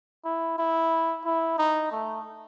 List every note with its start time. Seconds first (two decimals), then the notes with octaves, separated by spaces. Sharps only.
0.25 E4
0.58 E4
1.25 E4
1.58 D#4
1.92 A3